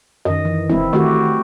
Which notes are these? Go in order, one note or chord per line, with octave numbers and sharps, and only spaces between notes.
F#2 D#3 D#5
E3
E1 C4 E4
D#3 A3 F#4 G4